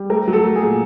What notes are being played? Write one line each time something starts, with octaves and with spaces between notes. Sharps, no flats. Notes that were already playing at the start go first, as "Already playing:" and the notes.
Already playing: G3
A3 A#4
F#3
A4
A3
G#4
A#2